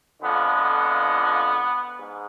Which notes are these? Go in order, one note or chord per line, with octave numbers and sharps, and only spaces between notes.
F2 D3 F3 G#3 B3
G#2